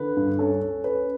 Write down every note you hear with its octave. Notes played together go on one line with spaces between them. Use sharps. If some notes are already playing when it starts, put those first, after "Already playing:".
Already playing: D3 B4
G2
C#4 A4
C#4
C#4 B4